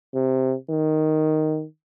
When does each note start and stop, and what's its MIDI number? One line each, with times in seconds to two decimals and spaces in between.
0.15 0.55 48
0.71 1.64 51